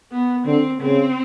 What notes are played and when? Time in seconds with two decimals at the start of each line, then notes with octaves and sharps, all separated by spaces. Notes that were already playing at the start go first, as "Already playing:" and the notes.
0.12 B3
0.46 D3 C4
0.81 C#3 C4